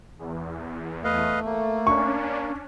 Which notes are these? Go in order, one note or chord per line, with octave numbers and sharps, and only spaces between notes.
E2
A3 B4 D#5 F5
A#3
C#4 D4 C#6